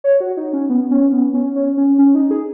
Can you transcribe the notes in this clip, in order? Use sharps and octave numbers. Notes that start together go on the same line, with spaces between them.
C#5
F#4
D#4
C#4
B3
C#4
B3
C#4
C#4
C#4
C#4
D#4
G#4